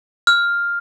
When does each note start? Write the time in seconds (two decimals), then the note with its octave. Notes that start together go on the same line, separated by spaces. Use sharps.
0.27 F6